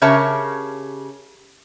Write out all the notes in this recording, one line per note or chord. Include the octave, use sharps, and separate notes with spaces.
C#3 G4 A#4 C#5 E5 A5